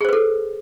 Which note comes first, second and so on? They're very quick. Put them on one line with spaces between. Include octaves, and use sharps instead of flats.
G#4 C5 B4 A4